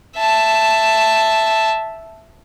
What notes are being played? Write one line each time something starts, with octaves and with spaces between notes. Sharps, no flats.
E5 A5